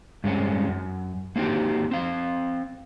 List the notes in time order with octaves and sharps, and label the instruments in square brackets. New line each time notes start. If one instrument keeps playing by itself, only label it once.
[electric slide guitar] G2 G#3 C4 C#4
F#2
A#3 C4 D#4 F#4 G4
C4 F5